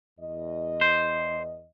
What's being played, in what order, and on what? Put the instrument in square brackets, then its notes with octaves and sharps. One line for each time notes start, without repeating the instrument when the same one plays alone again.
[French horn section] E2 D#5
[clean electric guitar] C5